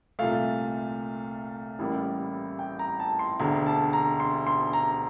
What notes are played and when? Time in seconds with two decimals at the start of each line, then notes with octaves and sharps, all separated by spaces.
0.19 C2 A#2 A3 F5
1.79 A1 A2 G3 A#3
2.59 G5
2.79 A#5
3.00 A5
3.19 C6
3.39 E1 D2 D3 A#5
3.66 A5
3.93 A#5
4.20 C6
4.47 C6
4.73 A#5